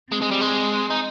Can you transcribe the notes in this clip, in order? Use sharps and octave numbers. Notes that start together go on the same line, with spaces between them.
G#3 C4
G#3
G3
G#3
D#4